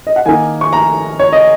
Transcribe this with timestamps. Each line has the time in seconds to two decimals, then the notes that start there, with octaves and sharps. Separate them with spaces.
0.07 D#5
0.16 F#5
0.26 D#3 A#3 D#4 G#5
0.61 C#6
0.73 A#5
1.19 C#5
1.33 D#5